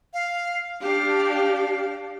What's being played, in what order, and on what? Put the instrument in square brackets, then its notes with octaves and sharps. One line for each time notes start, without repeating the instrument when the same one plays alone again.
[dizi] F5
[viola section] D4 G4 [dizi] F5